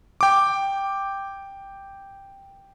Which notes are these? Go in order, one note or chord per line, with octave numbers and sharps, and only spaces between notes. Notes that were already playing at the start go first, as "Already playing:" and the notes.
G5 D6